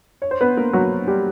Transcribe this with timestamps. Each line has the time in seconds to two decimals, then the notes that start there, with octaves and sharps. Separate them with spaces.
0.22 C#5
0.31 C5
0.41 B3 B4
0.57 A#3 A#4
0.73 F#3 F#4
1.08 G3 G4